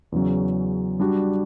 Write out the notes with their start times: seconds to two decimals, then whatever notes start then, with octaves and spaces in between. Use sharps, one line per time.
0.12 E2 C#3 F#3 C#4
1.00 G3 D4 F#4